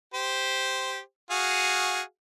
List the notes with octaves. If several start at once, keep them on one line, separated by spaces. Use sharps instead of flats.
G4 C5
F#4 G#4 F5